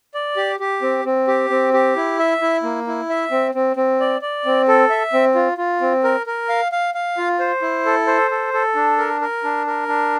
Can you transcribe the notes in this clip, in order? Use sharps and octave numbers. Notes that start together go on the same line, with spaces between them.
D5
G4
G4
C4
C4
G4
C4
G4
E4
E5
E4
A#3
E4
E5
C4
C4
C4
D5
D5
C4
A4
E5
C4
F4
F4
C4
A#4
A#4
F5
F5
F5
F4
C5
E4
A4
C5
A4
A4
D4
A#4
A#4
D4
A#4
D4